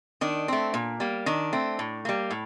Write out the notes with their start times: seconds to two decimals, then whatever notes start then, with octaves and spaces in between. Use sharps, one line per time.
0.21 D#3 D4
0.48 A3 C4
0.74 A#2
1.00 G3 A#3
1.26 D#3 D4
1.53 A3 C4
1.79 A2
2.05 G3 A#3
2.30 A2